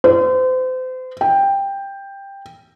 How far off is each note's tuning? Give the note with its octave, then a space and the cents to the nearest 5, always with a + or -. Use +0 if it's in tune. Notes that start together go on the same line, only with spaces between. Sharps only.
C5 -35
G5 +10